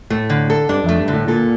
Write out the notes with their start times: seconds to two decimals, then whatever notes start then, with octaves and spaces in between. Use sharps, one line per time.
0.10 A2 A3
0.30 D3
0.50 A4
0.69 G2 D4
0.84 F2 A3
0.98 G2
1.08 D3
1.13 A2
1.28 A#2 A4